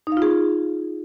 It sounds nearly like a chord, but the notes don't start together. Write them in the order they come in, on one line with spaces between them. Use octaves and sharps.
D#4 F5 F4 G#4